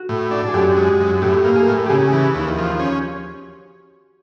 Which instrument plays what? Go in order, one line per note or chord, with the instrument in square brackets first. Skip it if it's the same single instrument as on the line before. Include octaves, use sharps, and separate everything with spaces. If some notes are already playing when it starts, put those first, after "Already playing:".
Already playing: [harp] F#4
[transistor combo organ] A2
D4
[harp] G#4
[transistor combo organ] F#2 [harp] G4
[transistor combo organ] G#3
F#2
[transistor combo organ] A2 [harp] G4
[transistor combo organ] A#3
[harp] G#4
[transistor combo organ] A2
[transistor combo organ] C#3 [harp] G4 G#4
[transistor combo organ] E3
D#2
F3
C#4